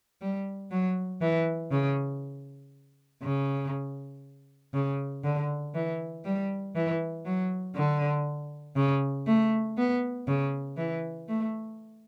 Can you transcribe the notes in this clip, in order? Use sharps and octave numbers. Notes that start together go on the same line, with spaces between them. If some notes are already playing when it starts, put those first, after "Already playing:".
G3
F#3
E3
C#3
C#3
C#3
D3
E3
G3
E3
F#3
D3
C#3
A3
B3
C#3
E3
A3